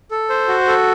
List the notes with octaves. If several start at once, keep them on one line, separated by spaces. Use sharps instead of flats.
A4
C5
F#4
A4